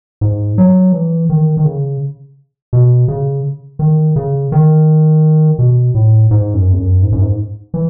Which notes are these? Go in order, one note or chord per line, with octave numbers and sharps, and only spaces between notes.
G#2
F#3
E3
D#3
D#3
C#3
B2
C#3
D#3
C#3
D#3
B2
A2
G#2
F#2
E2
F#2
G#2
F#2
G#2
E3